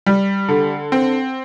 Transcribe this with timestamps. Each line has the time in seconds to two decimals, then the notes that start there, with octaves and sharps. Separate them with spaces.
0.06 G3
0.49 D3
0.92 C4